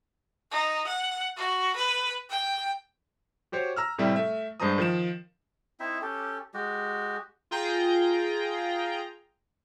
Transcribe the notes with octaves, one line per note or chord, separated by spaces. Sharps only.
D#4
F#5
F#4
B4
G5
F#4 G4 C5 C#5
A#5 E6 F6
A2 C3 G3 C4 E4
A3 E5
G2 G#3 C5 A5 A#5 D#6
D#3 F3 E7
C4 D#4 E4 E5
C#4 G4 A4
G#3 F#4 G4
F4 G#4 G5 A#5